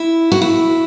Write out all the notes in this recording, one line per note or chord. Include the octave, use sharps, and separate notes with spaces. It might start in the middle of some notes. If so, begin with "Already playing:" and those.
Already playing: E4
F#4
E4